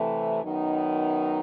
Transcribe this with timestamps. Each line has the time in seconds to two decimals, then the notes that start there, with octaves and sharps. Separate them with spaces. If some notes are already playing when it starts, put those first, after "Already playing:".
Already playing: C3 E3 A3
0.42 F#2 D#3 F#3 B3 D#4